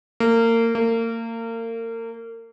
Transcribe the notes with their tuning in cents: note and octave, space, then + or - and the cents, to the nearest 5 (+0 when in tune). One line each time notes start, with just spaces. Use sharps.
A#3 -30
A#3 -35